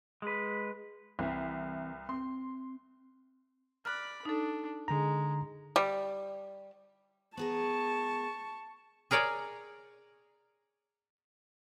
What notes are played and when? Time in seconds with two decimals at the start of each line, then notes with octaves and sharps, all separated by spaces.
0.22 G#3 B4
1.19 C2 E3 C4 E5
2.09 C4 C6
3.85 D5 B5 F6 F#6
4.25 D4 D#4 A4
4.88 D3 G#3 A#5
5.76 G3
7.37 B3 G#4 A#4 A5 C#6
9.11 G#4 A#4 C#5 D5 G#5